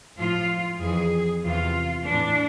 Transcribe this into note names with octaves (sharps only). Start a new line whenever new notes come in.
A2 F3 F4
F2 E3 G#4
E2 C3 E3 F4
A2 E3 D4